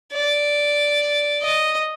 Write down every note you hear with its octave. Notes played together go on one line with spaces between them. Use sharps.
D5
D#5